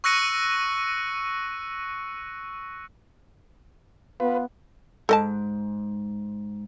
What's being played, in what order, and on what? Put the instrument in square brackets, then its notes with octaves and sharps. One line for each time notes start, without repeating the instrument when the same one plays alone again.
[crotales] C#6 E6 F#6 A#6 C#7 D#7
[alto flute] B3 [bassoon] F4 [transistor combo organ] B4
[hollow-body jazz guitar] G#2 [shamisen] A4 D#5 A5